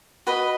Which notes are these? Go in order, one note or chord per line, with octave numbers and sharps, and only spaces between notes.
F#4 B4 D#5